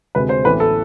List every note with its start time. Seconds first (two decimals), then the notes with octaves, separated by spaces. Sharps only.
0.15 D2 C3 G#3 B4
0.29 C5
0.44 A1 A2 E3 B3 B4
0.60 A4